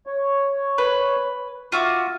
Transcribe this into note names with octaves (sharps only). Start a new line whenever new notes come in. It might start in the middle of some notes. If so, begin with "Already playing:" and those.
C#5
B4
F4 F#4 E5 D6